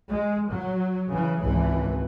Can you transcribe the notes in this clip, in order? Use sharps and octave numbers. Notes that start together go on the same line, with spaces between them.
G#3
F#3
C#3 E3
G#1 C#2 E3